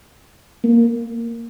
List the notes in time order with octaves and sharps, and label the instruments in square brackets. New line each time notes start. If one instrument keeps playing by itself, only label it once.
[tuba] A#3